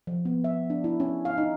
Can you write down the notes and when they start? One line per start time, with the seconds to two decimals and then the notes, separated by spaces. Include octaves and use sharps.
0.07 F3
0.25 B3
0.44 E5
0.70 D4
0.84 E4
1.00 C#4
1.25 F5
1.38 D#4